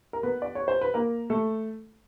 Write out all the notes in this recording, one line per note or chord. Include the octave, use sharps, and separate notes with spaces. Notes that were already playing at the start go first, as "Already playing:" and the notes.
A#4
B3 B4
D5
C#5
C5
B4
A#3 A#4
A3 A4